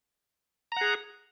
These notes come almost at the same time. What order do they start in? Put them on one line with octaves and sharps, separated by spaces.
A#5 F#5 G#4